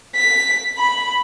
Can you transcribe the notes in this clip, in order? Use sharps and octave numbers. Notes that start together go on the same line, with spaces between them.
B6
B5